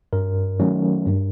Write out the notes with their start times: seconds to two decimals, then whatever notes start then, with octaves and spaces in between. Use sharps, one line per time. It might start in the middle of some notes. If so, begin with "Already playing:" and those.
0.13 G2 A#4
0.60 D#3 F#3 A3 C#4
1.07 G2